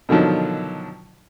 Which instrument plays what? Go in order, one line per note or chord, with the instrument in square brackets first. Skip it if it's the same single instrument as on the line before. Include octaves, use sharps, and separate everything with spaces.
[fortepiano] B2 D3 D#3 F3 F#3